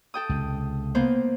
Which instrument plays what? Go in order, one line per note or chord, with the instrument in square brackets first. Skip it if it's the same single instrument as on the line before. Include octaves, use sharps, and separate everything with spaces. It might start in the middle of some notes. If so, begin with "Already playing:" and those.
[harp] A4 G5 D#6
[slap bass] C#2 C3
[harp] A#3 B3 C5